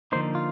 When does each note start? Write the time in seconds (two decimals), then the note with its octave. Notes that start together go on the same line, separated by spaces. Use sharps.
0.12 D3 F3 A#3 D#4 C5
0.35 F4